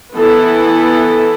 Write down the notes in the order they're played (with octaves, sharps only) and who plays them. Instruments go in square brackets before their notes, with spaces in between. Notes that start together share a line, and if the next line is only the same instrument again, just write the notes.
[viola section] E3 B3 E4 A4